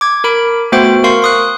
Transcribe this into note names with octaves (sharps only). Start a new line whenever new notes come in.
D6 G#6
A#4 B5 D7
A3 B3 F#4 C5 G5 D7
A#4 F5 C6 C#6 C7
C6 D#6 F#6